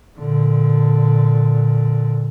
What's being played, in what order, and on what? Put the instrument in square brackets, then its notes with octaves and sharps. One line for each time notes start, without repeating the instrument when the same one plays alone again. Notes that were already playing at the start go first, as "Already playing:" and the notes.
[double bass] A#2 D3